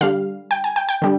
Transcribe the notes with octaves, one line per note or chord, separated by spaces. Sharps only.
D3 G3 F5
G5
G#5
G5
G5
D3 G3